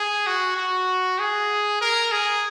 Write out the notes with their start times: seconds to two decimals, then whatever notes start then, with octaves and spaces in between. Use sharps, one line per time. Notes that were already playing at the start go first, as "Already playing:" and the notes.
Already playing: G#4
0.27 F#4
0.57 F#4
1.19 G#4
1.81 A#4
2.12 G#4